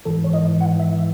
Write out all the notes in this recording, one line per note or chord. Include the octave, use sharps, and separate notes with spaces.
G#2 E3 A4
C#5
D#5
F#5
E5
E5